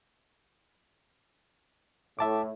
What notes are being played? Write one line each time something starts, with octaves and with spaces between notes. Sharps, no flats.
A2 E5 A5 D6